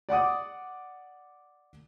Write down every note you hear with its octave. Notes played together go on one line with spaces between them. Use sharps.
D5 F#5 D6 D#6